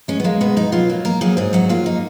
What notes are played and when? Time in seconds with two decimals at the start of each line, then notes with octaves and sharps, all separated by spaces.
0.08 G#3 C#4
0.20 B3
0.24 G#3 A#3
0.41 B2 B3
0.57 B2 D#4
0.72 F#3 F4
0.89 A#3
1.05 A#3 A#4
1.21 F#3 G#4
1.37 G#2 G#4
1.53 F#3 F#4
1.69 A#3 F4
1.86 D#4